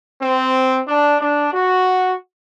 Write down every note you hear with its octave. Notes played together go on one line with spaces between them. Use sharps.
C4
D4
D4
F#4